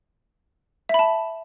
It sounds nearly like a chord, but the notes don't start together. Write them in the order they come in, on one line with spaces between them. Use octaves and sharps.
E5 B5 A5